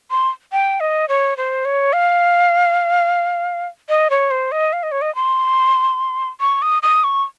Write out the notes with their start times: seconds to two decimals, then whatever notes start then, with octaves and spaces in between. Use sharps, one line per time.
0.11 C6
0.52 G5
0.80 D#5
1.09 C#5
1.37 C5
1.65 C#5
1.93 F5
3.89 D#5
4.10 C#5
4.31 C5
4.52 D#5
4.73 F5
4.83 D#5
4.92 C#5
5.02 D#5
5.15 C6
6.40 C#6
6.62 D#6
6.83 D#6
7.04 C#6